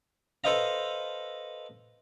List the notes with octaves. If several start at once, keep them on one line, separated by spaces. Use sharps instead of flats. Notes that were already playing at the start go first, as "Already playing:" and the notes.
A4 B4 C5 D#5 F5 A#5